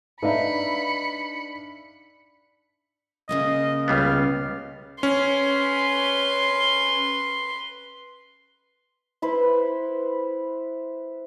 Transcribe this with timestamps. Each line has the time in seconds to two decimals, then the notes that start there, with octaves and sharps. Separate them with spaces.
0.23 D4 D#4 B4 E5 F5 B5 C#7
3.29 C#3 A#3 C#4 D#5
3.88 C#2 G3 B3 F5
5.03 C#4 B4 C6
9.22 E4 B4 C5